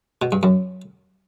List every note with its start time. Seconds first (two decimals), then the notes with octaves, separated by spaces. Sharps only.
0.22 B2
0.32 G2
0.43 F#2